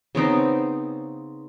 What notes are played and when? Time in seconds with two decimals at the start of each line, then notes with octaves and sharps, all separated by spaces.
0.15 C#3 B3 C4 D#4